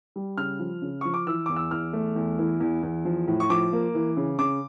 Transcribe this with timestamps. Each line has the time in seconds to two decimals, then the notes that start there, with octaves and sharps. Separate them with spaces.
0.16 G3
0.37 C#3 F6
0.59 F3
0.82 C#3
1.01 F3 C#6
1.14 D6
1.27 E3 E6
1.46 E2 D6
1.56 E6
1.71 E2 F6
1.93 A3
2.16 E2
2.38 E3
2.60 E2
2.83 E2
3.05 F3
3.28 A2
3.40 C#6
3.50 F3 D6
3.73 A#3
3.95 E3
4.17 C#3
4.39 C#3 D6